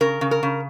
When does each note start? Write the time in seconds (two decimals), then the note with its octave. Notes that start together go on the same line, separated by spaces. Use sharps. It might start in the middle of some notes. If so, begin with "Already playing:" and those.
0.01 C#3 A#4
0.21 C#3
0.31 A#4
0.43 C#3